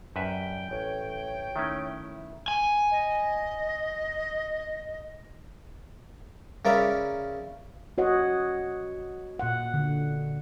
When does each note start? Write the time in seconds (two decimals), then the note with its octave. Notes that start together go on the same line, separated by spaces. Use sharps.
0.16 F#2 G3 B4 E5 G5
0.71 A1 A3 C#5
1.56 D#3 A3 C#4 E4
2.48 G#5
2.91 D#5
6.65 C#3 A#4 D5 E5 B5
7.98 F#4 C#5 D#5 F#5
9.39 A#2 F#5
9.74 D3